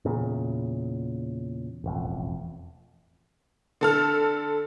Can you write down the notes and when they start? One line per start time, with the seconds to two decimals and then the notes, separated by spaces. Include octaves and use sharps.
0.05 E2 A#2 C#3
1.84 E1 A1 F2
3.81 D3 A4 F6